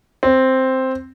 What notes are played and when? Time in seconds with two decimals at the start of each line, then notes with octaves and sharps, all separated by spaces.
0.23 C4